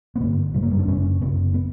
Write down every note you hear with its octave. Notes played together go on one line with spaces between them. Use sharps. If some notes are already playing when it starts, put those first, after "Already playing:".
B3
G2 D3 A#3
F#2 C#3 G3
A#3
G3
D4
F#2 C#3 C#4
F#2 C#3 B3
B3